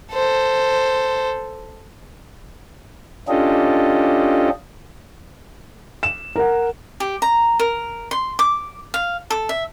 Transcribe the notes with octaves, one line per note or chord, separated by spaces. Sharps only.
A4 C5
C#4 D4 F4 G4 A4 D#5
E7
A#4 F#5
G4
A#5
A#4
C6
D6
F5
A4
E5